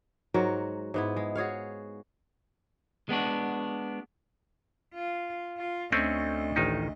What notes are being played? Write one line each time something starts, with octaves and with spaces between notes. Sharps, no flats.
G#2 F#3 F#4 A#4
G#2 B3 E4
G#3
F#4 G#4 C#5 F5
G#3 B3 D4 F#4
F4
F4
D2 A3 C4 C#4 D#5
A1 D#3 D#4